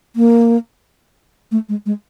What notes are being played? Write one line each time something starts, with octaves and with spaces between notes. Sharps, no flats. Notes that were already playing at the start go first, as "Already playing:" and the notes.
A#3
A3
G#3
G#3